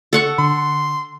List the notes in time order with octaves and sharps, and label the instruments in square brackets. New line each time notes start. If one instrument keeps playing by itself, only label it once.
[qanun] A4 F#5 C#6
[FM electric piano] D3 [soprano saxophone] C6